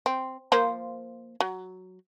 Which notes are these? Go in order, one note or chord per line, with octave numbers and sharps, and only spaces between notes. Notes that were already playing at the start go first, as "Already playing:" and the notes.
C4
F3 A#3 C5
F#3